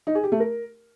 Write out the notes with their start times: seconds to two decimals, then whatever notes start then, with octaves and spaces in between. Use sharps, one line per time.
0.07 D#4
0.15 G#4
0.23 G4
0.32 A3
0.40 A#4